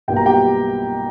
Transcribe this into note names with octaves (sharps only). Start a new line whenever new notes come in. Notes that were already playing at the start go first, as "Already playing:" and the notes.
B1 B2 G3 A#3 G5
A#5
G4 G5